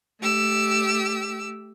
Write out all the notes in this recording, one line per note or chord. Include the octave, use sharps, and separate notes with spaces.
A3 G4 E6